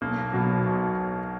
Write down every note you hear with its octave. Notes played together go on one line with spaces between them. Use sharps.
B1 A#3
B2 F#3
B1